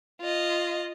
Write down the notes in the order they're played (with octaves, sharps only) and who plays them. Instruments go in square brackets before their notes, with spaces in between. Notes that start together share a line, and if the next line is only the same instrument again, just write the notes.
[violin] F4 D#5